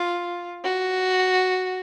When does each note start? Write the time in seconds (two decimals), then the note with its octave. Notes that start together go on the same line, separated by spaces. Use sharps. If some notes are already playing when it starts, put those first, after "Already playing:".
Already playing: F4
0.64 F#4